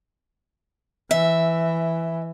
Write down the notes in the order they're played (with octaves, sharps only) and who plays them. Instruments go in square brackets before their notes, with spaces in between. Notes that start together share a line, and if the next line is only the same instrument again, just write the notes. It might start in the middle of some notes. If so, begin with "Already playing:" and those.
[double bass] E3 [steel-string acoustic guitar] E5